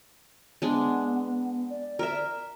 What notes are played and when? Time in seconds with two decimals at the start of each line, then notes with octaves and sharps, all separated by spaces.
0.62 G#3 B3 D4
1.69 D5
1.99 A#4 E5